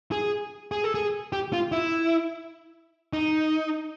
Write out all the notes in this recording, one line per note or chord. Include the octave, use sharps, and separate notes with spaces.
G#4
G#4
A4
G#4
G4
F4
E4
D#4